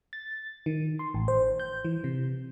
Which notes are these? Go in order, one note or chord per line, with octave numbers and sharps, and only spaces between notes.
A6
D#3
C6
A1
C5
G6
E3
C3